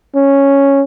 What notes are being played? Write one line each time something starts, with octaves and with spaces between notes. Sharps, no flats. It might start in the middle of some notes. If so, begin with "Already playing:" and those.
C#4